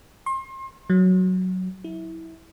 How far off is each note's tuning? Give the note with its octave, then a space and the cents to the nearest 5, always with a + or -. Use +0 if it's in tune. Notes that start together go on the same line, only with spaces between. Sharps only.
C6 +35
F#3 +0
E4 -20